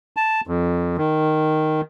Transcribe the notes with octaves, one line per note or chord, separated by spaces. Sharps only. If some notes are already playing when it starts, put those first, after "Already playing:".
A5
F2
D#3